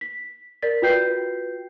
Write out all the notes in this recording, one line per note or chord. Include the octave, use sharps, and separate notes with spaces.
B6
A#4 D5 A6 B6
F4 F#4 B4 G5 G6 C7